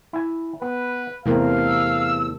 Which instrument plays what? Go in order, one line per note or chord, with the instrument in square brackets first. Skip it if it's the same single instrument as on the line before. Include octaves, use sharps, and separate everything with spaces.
[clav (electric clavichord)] E4 G#5
[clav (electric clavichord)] B3 [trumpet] B4
[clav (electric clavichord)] E2 C4 [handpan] C3 A3 A#4 [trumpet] F5
[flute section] E6